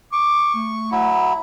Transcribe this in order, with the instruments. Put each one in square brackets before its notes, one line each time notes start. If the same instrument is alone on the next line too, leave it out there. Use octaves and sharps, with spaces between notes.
[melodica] C#6 [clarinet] D6
[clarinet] A3
[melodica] F#3 E4